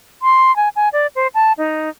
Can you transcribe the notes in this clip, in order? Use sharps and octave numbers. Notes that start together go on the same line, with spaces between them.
C6
G#5
G#5
D5
C5
A5
D#4